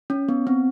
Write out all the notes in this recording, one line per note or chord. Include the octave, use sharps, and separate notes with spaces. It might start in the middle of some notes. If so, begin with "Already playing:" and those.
C#4
B3
C4